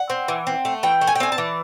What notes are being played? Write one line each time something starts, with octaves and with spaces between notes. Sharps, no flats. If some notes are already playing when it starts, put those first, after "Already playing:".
Already playing: F#5
C4
E3
C4
A3
E3 G5
A3
G#5
G5
C4 G#5
A5
E3